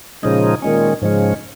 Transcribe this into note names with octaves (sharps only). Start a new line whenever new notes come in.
A#2 C#3 F3 G#3 D#4
A#2 D#3 G#3 C#4
G#2 C#3 F3 G#3 C#4